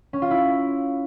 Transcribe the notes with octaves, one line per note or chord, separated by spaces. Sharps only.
C#4
F4
E4